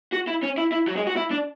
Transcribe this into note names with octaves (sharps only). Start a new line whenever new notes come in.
F#4
E4
C#4
E4
E4
F#3
G#3
F#4
E4
D4